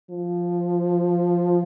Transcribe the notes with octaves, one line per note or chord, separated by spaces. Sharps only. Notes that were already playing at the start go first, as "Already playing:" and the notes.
F3